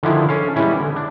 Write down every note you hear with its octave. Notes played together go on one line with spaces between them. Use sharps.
D3 D#3 F3 D4 E4 G#4
C#4 A4 F5
E3 G3 G#3 B3 C#4 E4
D3
D4